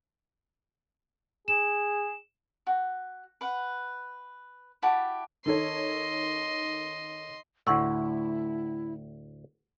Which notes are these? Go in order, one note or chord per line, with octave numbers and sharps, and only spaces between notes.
G#4 E7
F#4
B4 F#5
E4 F#4 G4 A5
D#3 A4 C#5 D#5 C6
D2 A2 E4 F#5 C#6 E6